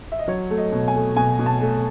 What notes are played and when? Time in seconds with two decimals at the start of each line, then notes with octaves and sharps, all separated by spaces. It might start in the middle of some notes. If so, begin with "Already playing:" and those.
0.12 E5
0.19 D#5
0.28 F#3 C#5
0.50 A3
0.58 D#5
0.72 B2
0.88 G#5
0.95 A3
1.16 B2 G#5
1.39 B2
1.46 A5
1.62 A3